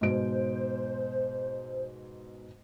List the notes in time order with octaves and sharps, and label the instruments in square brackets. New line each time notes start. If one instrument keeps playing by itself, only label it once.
[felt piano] G#2 B2 D7 [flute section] C5